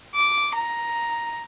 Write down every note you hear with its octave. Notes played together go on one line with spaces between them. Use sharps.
D6
A#5